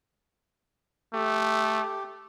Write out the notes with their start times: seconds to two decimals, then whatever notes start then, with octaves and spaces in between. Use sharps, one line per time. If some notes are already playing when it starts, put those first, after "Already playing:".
1.14 A3 G4